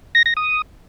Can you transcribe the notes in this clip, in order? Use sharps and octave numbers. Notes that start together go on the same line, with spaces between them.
A#6
A#6
D#6